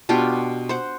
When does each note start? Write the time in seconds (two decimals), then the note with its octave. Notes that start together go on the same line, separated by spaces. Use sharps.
0.09 B2 D4 F4 G4
0.69 C5 F#5